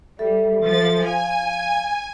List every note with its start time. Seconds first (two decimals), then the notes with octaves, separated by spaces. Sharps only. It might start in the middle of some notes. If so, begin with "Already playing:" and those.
0.19 G3 A4 E5
0.63 F3 A6
1.05 F5 G#5